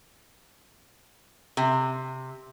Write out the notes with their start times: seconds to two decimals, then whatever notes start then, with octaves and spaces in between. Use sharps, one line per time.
1.57 C3